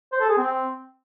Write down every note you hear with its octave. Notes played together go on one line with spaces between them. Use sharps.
C5
A4
G#4
C4